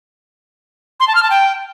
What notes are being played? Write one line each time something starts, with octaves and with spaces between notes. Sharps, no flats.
C6
A5
F6
A5
G5